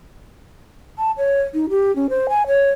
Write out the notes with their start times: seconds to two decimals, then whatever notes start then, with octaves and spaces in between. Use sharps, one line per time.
0.98 A5
1.18 C#5
1.54 D#4
1.70 G4
1.96 C#4
2.10 C5
2.29 G#5
2.47 C#5